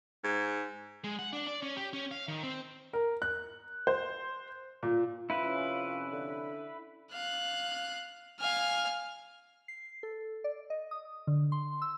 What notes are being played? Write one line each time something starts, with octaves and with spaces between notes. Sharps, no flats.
G#2
G#3
F#5
D4
D5
C#4
G4
C#4
F5
D#3
C4
A#4
F#6
C5
A#2
F2 C3 C#4 E4 F4 B4
D3
F5 F#6
F5 G#5 F6
C7
A4
D5
D#5
D#6
D3
C6
E6